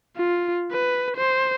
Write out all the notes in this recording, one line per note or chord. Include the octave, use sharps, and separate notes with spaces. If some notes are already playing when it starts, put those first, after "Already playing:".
F4
B4
C5